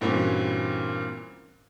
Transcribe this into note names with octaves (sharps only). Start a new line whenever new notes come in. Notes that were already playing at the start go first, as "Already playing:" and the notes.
G2 A#2 E3 C4 C#4 F#4